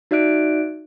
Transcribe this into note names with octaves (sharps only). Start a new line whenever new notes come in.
D#4 F#4 D5 E5 F#6 D7